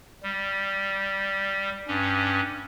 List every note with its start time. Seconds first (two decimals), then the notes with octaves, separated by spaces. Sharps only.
0.23 G3
1.87 G2 C#4